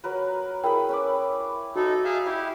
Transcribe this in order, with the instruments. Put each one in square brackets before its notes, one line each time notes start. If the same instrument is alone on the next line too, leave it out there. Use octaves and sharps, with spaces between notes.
[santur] F#3 A#4 B4
[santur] E4 G#4 B5 [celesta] A#4 G5
[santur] C#4 B4 D6
[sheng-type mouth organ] D#4 A4 [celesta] F#4
[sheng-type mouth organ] G#4 E5 F5
[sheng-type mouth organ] E4 G4 [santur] E5